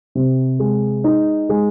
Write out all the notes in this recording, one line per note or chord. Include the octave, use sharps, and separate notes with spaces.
C3
G#3
D#4
G#3